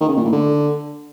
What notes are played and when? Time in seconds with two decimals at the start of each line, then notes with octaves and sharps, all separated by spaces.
0.01 D#3
0.09 C#3
0.17 A#2
0.25 A2
0.33 D3